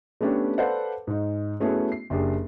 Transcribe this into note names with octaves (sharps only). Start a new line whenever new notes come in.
A3 B3 C#4 D4 G4
A4 B4 C5 D5 F5 F#5
G#2 D#4
A3 B3 C#4 E4 F#4 G#4
C7
F#1 D4 G4 G#4